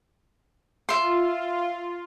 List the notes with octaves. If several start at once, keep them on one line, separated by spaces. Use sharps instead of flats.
F4 E5 C6